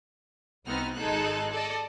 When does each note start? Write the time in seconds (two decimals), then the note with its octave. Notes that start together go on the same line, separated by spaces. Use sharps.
0.66 C2 B3 C4 D#4 F#4 F6
0.96 G#1 G#3 D#4 A4 C6 F#6
1.51 A4 D5 D#5